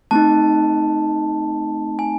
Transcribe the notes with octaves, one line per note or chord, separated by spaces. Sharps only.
A3 C4 D#4 A5
G#5